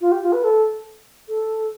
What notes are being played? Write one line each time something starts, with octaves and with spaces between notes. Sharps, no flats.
F4
G4
F4
B4
A4
A4